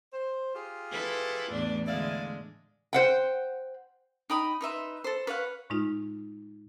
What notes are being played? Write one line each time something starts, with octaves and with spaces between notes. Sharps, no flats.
C5
F4 G4 G#4
E4 A4 B4
E2 A2 D4
D3 G#3 E4 D5 F5
C5 F#5 G5
D#4 G5 B5 D#6
D#4 B4 E5 C6
A4 C5
B4 C#5 F5 F#5
A2 G#3 D#4 F4